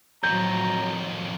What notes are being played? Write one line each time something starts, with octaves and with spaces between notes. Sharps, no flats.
F2 A2 D#3 F#3 A#5 G6